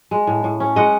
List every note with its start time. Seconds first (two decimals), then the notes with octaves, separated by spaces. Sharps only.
0.11 G#3
0.27 A2
0.44 A2
0.60 C#4
0.76 G#3 D#5 F#5